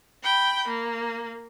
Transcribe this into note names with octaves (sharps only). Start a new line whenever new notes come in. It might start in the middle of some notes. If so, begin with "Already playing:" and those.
G5 B5
A#3